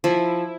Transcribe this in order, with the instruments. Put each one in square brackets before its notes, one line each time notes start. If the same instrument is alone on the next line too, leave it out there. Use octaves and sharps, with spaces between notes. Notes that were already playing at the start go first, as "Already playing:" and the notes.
[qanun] F3 [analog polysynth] E4